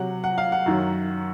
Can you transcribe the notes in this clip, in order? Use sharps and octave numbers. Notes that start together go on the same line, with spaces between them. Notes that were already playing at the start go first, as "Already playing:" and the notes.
Already playing: C3 F#3 F#5
F#5
F5
F#5
F#2 D#3 F#3